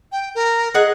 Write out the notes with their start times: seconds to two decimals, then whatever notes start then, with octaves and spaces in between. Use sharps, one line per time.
0.12 G5
0.35 A#4
0.74 G#4 D#5 F#5 F#6